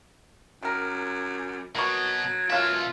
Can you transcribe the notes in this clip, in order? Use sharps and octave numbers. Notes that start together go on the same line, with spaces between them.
F#2 D#3 A#4
B2 F#3 A#4 B4 C#6
B2 A#3 C#4 F4 E5 F5